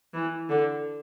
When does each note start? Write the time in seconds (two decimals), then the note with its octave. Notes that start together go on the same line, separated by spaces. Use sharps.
0.14 E3
0.49 D3